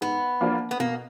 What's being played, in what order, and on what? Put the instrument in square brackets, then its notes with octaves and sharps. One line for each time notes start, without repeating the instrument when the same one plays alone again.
[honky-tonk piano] G#2 [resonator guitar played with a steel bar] B3
[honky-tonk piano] F3 A#3 D4 F4
[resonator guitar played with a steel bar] B3
[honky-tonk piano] B2 [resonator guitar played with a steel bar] A#3